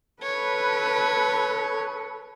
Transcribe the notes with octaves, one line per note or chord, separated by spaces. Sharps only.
A4 B4 C#5